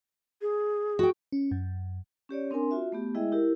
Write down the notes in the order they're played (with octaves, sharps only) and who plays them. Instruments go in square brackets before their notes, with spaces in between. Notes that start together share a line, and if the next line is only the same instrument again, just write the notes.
[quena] G#4
[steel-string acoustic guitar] F#4 G5
[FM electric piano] C#4
F#2
[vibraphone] C#4 G4 C#5 D5
C4 D4 A#4 G#5 C6
F4 F#4 E5
A3 B3 G4
G#3 E4 G#4 D#5 E5 G5
E4 G4 A#4